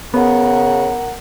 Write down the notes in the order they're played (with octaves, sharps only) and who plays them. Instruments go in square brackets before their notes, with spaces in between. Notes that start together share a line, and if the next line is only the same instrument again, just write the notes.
[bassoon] C#3 [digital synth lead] B3 [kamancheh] A#4 F#5